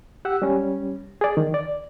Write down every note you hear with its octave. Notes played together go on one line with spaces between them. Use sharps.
G4 F#5 E6
G3 C#4
G#4 D5
D#3
D5